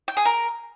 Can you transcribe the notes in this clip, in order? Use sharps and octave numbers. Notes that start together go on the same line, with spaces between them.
G5
G#4
A#4